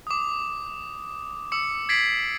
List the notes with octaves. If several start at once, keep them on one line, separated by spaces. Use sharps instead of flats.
D6 D#6
D6 E6 C#7
G#6 A6 B6 C7 D7 F#7